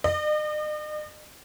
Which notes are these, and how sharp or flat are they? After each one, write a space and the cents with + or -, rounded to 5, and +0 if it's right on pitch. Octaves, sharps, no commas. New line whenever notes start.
D#5 -45